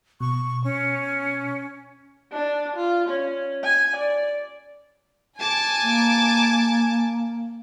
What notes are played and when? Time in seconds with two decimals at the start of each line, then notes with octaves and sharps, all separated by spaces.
0.20 B2 C#6
0.64 C#4
2.32 D4
2.76 F4
3.09 C#4
3.64 G#5
3.96 D5
5.40 G#5 A5 D6
5.84 A#3